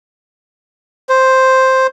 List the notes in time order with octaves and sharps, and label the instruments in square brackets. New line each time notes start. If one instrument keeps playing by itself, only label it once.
[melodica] C5